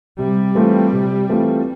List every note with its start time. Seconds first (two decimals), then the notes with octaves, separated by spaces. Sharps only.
0.18 C3 G3
0.55 E3 A3 C4 F4
0.93 C3
1.29 E3 A3 C4 F4